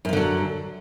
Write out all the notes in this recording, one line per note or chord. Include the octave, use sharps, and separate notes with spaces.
F#2 D3 F3 F#3